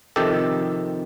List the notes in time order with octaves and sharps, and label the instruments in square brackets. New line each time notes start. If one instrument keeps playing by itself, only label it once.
[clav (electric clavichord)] F2 C3 D#3 G4 A4